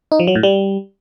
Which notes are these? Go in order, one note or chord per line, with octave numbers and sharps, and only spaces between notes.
D#4
F3
F#3
A2
G3